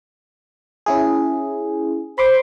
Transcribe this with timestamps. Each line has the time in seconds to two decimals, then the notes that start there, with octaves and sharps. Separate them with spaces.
0.86 C#4 E4 G#4
2.18 C5 B5 C6 D6